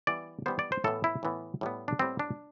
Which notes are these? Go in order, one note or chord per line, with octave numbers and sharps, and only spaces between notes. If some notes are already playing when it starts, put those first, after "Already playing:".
E3 G3 B3 D5
E3 G3 B3 C5
D5
C5
A2 E3 B3 A4
E4
A2 E3 B3
A2 G3 B3
D4
A2 G3 B3 C4
D4